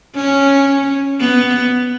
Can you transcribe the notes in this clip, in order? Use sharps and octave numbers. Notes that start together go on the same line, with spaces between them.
C#4
B3